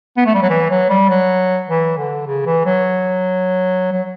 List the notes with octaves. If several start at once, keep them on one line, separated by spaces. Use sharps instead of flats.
B3
A3
G3
F#3
E3
F#3
G3
F#3
E3
D3
C#3
E3
F#3
F#3